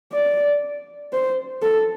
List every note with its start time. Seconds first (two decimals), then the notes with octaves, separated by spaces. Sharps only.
0.13 D5
1.13 C5
1.62 A4